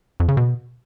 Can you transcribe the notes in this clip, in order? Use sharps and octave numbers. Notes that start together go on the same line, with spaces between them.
F2
C#3
B2